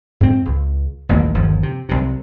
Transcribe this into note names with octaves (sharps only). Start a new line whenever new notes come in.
G#2 C4
C#2
A1 D#2 A#2 A#3
G1 D#2 F3
C3
C2 C3